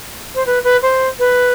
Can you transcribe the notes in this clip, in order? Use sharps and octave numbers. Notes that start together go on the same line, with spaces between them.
C5
B4
B4
C5
B4